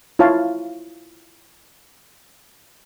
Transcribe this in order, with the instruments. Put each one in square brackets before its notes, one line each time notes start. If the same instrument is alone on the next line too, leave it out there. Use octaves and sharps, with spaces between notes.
[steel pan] E4 F4 C#5 F5 A5